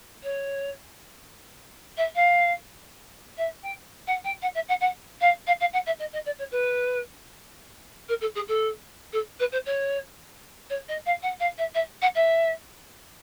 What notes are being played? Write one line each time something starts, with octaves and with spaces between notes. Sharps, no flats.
C#5
E5
F5
E5
G5
F#5
G5
F#5
E5
F#5
F#5
F5
F5
F5
F#5
E5
D#5
D#5
D5
C#5
B4
A#4
A4
G#4
A4
A4
B4
C5
C#5
C#5
D#5
F5
F#5
F5
E5
E5
F#5
E5